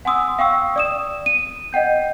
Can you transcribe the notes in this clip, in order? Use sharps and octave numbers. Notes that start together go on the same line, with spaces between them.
F#5 G#5 C6 D#6 E6
F5 G5 C#6 E6
D5 D#6 E7
D#7
D#5 F#5 G5 G6